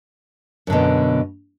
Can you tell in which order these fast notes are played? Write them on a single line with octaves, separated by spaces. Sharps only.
F#2 D3 B2